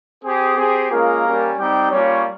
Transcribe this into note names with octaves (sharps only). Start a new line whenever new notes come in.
C4 G4 G#4
C4 G4 G#4
G#3 A#3 C#4 F4 A#4
G3 C#4 G4
G3 C4 D#4 G4 G5
G3 A#3 C#4 F4 C#5